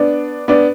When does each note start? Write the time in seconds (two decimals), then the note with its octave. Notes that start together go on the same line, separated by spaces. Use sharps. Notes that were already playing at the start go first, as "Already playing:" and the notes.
Already playing: B3 D4
0.48 B3 D4